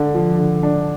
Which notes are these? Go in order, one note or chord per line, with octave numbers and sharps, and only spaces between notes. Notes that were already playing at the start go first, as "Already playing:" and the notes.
Already playing: D3 D4
F3
D3
D4